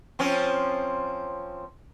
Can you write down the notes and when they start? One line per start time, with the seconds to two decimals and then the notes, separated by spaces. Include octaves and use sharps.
0.19 F3 C4 C#4